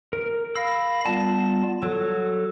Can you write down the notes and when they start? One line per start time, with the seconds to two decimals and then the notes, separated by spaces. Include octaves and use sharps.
0.13 A#4
0.56 F5 B5 E6 A#6
1.06 G3 B3 F4 A5
1.83 F#3 A4